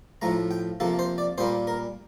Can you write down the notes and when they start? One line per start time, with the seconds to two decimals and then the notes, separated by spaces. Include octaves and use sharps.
0.22 A2 F3 A3 A#5
0.51 G5
0.80 C3 F3 A#3 A4
0.99 C5
1.18 D5
1.38 A#2 G3 A#3 C5
1.67 A#4